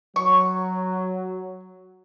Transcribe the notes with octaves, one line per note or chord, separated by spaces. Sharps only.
F#3 C#6